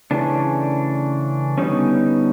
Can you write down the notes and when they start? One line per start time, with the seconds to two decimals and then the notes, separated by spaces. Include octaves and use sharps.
0.11 C#3 E3 A3 C#4 D4
1.58 D3 G3 B3 C#4 D#4